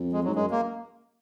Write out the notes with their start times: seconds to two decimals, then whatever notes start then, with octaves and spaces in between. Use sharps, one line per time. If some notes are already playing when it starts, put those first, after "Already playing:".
Already playing: F2
0.12 G#3
0.24 F#3
0.27 G#2
0.35 F#2 G#3
0.51 A#3